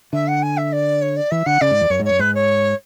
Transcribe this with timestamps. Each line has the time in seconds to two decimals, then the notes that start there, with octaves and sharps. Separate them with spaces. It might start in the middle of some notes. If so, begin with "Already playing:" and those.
0.13 D3 E5
0.27 F#5
0.42 G#5
0.57 E5
0.72 D5
1.01 C#5
1.16 D5
1.31 E3 E5
1.46 D3 F#5
1.61 C#3 D5
1.71 G#2
1.81 E2
1.90 F#2 C#5
2.00 G#2
2.05 F#2 C#5
2.19 G#2 B4
2.34 C#5